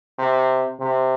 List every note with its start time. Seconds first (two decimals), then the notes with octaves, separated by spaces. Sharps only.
0.18 C3
0.79 C3